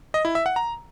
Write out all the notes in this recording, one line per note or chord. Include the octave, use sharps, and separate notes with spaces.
D#5
E4
E5
F#5
A#5